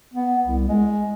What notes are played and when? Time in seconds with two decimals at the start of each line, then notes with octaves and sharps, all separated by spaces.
0.14 B3
0.44 C2
0.68 G#3